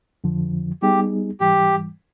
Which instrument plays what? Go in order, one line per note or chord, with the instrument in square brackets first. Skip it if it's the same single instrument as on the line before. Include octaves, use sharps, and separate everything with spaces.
[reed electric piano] F2 D3 F3
[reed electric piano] G3 B3 D#4 G#4 [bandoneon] G4
[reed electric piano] G#2 E3 G3 [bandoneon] G4